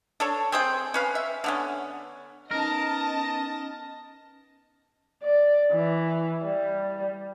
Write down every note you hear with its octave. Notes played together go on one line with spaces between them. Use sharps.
D4 A4 C#5
C4 G#4 C5 G5
C#4 B4 F5
E5
D3 B3 C#4
B3 C#4 D#4 A#4 D#5 A5 A#6
D5
E3
G3